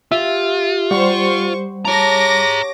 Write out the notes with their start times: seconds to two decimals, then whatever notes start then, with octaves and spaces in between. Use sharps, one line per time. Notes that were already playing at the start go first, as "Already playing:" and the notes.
0.12 F4 G4 E5
0.91 G3 C5 F#5 C#6
1.85 G#4 C#5 A5 A#5 D6 A#6